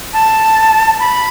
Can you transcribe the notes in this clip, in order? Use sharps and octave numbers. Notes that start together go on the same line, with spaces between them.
A5
B5